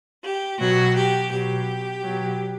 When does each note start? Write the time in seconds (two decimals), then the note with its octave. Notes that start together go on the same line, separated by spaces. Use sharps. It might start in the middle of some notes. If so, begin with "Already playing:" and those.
0.24 G4
0.59 B2 F#3 F#4
0.96 G4
1.31 B2 F#3 G4
2.03 B2 F#3